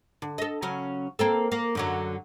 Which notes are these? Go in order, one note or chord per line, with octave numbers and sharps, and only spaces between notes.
D3
A4 D#5
C#3 F#3 C#4
A#3 C4 A4
A#3
F#2 D3 F#3